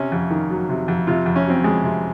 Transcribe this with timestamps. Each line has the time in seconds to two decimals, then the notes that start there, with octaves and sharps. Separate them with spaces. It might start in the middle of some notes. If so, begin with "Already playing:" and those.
Already playing: C3 C#4
0.12 F2
0.31 D#3
0.50 F#3
0.69 C3
0.88 F2
1.07 C3 F4
1.26 F2
1.36 C#4
1.45 F#3 C4
1.64 F2 G#3
1.83 C3